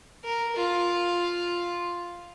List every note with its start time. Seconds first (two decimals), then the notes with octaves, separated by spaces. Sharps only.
0.24 A#4
0.56 F4